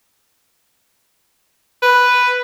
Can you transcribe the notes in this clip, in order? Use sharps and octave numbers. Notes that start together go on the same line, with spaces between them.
B4